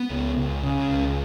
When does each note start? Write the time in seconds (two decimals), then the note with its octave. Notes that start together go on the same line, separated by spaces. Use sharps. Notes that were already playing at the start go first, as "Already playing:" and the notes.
Already playing: B3
0.10 C#2
0.37 C#2
0.63 C#3
0.88 C#2